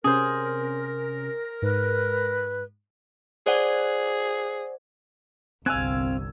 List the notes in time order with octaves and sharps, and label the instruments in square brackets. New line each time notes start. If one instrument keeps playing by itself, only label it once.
[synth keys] C3 C#4 [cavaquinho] G#4 C5 [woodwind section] A#4
[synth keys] G#2 [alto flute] B4
[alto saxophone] G#4 [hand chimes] C5 D5 F#5
[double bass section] G1 C2 [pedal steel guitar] C4 F5 [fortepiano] G#5 F#6 [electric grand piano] E6 G#6